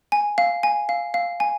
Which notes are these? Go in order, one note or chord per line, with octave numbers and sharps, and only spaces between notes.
G#5
F5
G#5
F5
F5
G#5